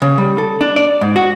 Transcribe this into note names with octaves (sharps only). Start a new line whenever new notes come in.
C#3
G3
A4
D4
D5
G#2
F#4